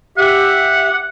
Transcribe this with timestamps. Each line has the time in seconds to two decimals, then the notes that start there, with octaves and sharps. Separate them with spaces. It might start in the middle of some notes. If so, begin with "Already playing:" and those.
0.18 G4 E5 F#5